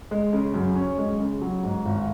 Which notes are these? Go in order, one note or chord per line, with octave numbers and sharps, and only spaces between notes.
G#3
C#3
F#2
C#4
G#3
C#3
F#3
G#2
G#1